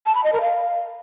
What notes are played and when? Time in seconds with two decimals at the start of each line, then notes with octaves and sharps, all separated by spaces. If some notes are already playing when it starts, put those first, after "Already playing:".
0.06 A5
0.15 B5
0.24 D#5
0.32 A#4
0.41 F5